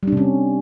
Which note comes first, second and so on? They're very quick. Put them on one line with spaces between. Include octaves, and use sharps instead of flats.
G3 D4 C3 C#4